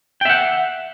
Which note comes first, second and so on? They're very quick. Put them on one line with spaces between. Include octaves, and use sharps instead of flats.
G5 E5 F#5